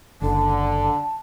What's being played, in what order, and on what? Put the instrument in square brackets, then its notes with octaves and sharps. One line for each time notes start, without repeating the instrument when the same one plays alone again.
[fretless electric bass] F#1 [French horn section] D3 [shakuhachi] A5